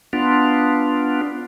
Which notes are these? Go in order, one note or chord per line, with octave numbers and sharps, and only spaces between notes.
B3 D4 F4